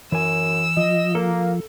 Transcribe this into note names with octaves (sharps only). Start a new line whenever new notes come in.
F#2 E3 G#5 E6
F3 D#5
A#3 A4